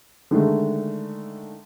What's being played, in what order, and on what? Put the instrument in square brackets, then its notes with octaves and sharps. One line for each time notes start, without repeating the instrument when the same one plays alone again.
[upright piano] D3 D#3 G#3 A3